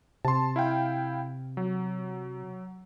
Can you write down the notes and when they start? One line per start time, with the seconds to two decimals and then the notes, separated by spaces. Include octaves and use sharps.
0.25 C3 A5 C6
0.56 E4 F5 G5
1.57 F#3